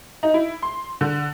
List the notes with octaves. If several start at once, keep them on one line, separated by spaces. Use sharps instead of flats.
D#4
E4
C6
D3